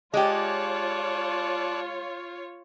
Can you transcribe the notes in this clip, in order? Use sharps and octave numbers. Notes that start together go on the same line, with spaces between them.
G#3 F4 G4 C#5 D5 A5 F#6